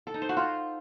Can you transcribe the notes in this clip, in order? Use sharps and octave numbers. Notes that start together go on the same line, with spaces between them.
A4
D#4
C5
F#4
F4